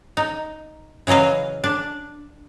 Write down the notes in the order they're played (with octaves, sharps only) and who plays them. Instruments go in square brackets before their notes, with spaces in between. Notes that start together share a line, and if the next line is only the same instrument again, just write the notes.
[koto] D#4
C#3 E3 F#3 D#5 F5
D4